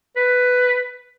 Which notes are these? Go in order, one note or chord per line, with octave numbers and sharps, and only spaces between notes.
B4